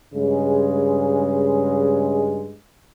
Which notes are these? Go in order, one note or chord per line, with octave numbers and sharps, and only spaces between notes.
G2 C#3 G#3